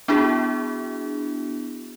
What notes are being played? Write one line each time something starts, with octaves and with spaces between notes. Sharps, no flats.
B3 D4 E4 F#4 G#4